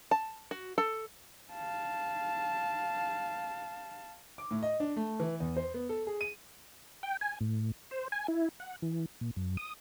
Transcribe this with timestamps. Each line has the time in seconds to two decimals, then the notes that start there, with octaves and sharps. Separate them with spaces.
0.11 A5
0.51 F#4
0.78 A4
1.53 F5 A5
4.38 D6
4.51 A2
4.63 D#5
4.80 D4
4.96 A3
5.20 E3
5.40 E2
5.56 C5
5.74 B3
5.89 A4
6.07 G#4
6.21 D#7
7.03 G5
7.21 G#5
7.41 A2
7.91 C5
8.12 G#5
8.28 E4
8.60 F#5
8.82 E3
9.21 A#2
9.36 F#2
9.57 D#6